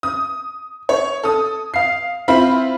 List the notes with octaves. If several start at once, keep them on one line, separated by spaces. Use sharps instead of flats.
D#6
C#5
A4 D#6
F5 C7
C4 E4 F4 E5 B5